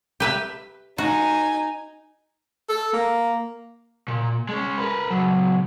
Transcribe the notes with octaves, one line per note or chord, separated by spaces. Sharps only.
G4 B4 E5
D#4 F#4 G#5
A4
A#3
A#2
G#3 C#4
A#4 B4
C#2 F#3